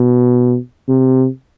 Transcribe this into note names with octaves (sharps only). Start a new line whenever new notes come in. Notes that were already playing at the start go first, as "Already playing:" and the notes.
Already playing: B2
C3